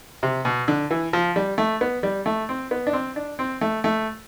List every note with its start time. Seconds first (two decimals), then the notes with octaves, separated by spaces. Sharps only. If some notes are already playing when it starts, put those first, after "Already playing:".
0.23 C3
0.45 B2
0.68 D3
0.91 E3
1.13 F3
1.36 G3
1.58 A3
1.81 B3
2.03 G3
2.26 A3
2.49 C4
2.71 B3
2.87 D4
2.93 C4
3.16 D4
3.39 C4
3.61 A3
3.84 A3